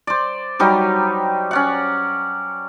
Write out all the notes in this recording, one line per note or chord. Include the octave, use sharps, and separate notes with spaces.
C5 D5
F#3 G3 D#4 G4
C#4 D5 F#5